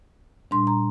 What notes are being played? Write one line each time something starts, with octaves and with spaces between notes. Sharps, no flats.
A#2 G3 D4 C6
A#5